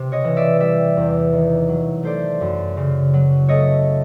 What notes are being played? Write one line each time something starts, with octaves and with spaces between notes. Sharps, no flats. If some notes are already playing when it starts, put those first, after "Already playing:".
Already playing: C3
C#5 D#5
E3
D5 E5
G3 D5 E5
E2
D#3
F#3
A3 C5 D5
F#2
C#3
F#3
A3 C#5 D#5